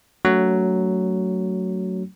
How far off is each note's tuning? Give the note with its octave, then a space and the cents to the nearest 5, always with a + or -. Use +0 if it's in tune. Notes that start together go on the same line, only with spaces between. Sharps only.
F#3 +10 A3 +20 C#4 +35